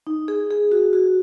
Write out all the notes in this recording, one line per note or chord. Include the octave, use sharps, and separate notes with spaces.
D#4
G#4
G#4
F#4
F#4